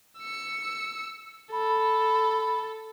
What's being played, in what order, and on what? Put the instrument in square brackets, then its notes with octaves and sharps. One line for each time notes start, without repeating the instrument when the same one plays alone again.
[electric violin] E6 C#7
[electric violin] A4 [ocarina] B5